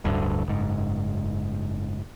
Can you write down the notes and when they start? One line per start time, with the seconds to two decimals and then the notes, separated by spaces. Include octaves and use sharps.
0.04 D1 D2 G2 D3
0.47 F#1 G#2